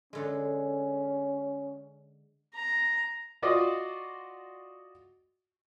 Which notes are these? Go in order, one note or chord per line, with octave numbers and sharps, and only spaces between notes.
D3 G#3 C#4
A#5
F4 F#4 D5 D#5